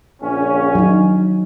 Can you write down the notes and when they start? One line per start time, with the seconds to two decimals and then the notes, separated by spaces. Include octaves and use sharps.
0.22 A#1 C#3 C#4
0.75 F#3 D#4